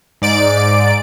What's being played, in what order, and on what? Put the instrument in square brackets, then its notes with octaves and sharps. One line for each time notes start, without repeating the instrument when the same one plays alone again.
[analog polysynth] G#2 D5 D7